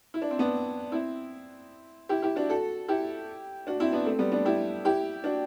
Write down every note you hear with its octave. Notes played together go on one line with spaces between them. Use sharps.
E4
D4
C4
B3 D4
C4 E4
E4 G4
E4 G4
D4 F#4
F#4 A4
E4 G4
D4 F#4
C4 E4
B3 D4
A3 C4
G3 B3
B3 D4
E4 G4
E4 G4
D4 F#4